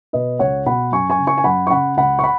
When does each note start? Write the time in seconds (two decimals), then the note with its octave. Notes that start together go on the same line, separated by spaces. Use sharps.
0.13 B2 B4 D#5
0.39 C#2 C#5 F#5
0.66 B2 F#5 B5
0.92 F#2 G#5 C#6
1.10 G#5 C#6
1.19 C#3
1.27 G#5 C#6
1.38 G#5
1.44 F#2 F#5 B5
1.67 C#6
1.70 C#3 F#5 B5
1.97 C#2 F#5 B5
2.19 C#6
2.24 F#5 B5